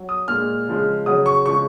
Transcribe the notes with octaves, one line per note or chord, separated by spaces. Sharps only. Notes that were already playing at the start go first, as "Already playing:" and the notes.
Already playing: F#3
D#6
A#2 G#3 F6
C#3 F3 G#3
C#3 F#3 D#6
C#6
C#3 F3 G#3 C#6